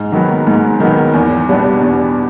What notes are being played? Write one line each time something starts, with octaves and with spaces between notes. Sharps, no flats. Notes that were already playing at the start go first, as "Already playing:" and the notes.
Already playing: G#2
D#3 F#3 B3
G#2
D#3 F#3 B3
E2
B2 G3 B3 D4
E2